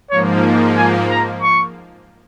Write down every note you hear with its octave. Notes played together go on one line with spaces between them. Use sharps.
G#2 F3 A#3 C#5
G#5
A#5
C#6